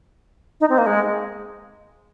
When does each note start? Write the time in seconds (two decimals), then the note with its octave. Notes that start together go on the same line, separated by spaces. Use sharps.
0.60 D#4
0.70 C4
0.78 A#3
0.86 G#3